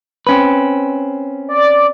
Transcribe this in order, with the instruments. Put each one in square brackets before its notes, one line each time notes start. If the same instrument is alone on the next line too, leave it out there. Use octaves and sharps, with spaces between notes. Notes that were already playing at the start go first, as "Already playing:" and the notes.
[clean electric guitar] C4 C#4 B4
[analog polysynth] D5